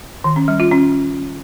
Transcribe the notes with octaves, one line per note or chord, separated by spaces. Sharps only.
D#3
C#4
G3
F4
C#4